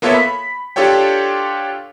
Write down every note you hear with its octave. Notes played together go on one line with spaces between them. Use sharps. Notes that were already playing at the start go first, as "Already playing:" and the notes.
A#3 B3 F4 A4 C#5 E5
B5 B6
D4 F4 G4 A4 C#5 G5